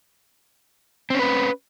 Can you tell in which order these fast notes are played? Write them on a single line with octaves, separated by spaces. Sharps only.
C4 C#4 B4